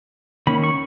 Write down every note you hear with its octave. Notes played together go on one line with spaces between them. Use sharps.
D#3 A#3 C#4 B5
C#6